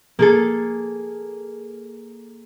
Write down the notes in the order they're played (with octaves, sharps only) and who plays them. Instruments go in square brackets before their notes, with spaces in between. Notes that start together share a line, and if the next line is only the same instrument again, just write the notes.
[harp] A#3 G#4 A4